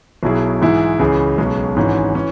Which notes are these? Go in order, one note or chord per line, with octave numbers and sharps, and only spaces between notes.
B1 B2 F#3 E4 G#4
G#2 E3 G#3 E4 G#4
C#2 C#3 E3 C#4 G#4
B1 B2 G#3 C#4
G#1 G#2 E3 C#4
E3 C#4